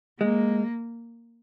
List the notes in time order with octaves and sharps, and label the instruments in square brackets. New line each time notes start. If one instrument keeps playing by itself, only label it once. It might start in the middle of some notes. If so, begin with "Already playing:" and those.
[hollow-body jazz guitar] G#3 [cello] A#3